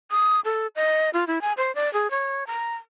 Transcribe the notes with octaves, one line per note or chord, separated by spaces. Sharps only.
D#6
A4
D#5
F4
E4
G#5
C5
D5
G#4
C#5
A#5